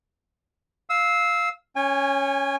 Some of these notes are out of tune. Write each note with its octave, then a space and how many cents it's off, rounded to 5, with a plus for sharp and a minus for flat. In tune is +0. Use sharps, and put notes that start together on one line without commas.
F5 +0 E6 -20
C#4 +0 C#5 +0 G#5 -35